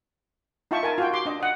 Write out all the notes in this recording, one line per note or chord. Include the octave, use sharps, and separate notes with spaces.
D#4 F4 E5 G5 A5 C#6
A#4 G#5 A5
F4 F#4 G5
G4 C6 D6
D4 D#5
D#5 F#5